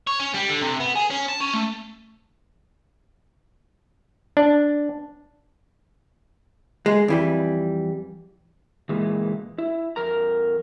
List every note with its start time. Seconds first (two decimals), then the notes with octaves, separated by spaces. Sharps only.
0.07 C#5
0.19 C#4
0.34 G3
0.49 D3
0.62 C3
0.80 B3
0.95 G#4
1.10 C#4
1.29 A5
1.41 C#4
1.54 A3
4.37 D4
6.86 G#3
7.08 F2 E3 G3
8.89 A#2 E3 G#3
9.58 E4
9.96 F2 A#4 A#5